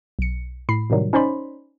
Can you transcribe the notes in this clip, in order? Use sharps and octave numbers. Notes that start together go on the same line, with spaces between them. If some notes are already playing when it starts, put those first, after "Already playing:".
B1 C#7
A2 B5 C7
A2 C3 D#3 F#3 G3
C#4 D#4 C5 D5 B5 C6